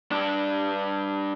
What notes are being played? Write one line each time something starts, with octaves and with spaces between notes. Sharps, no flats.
G2 D4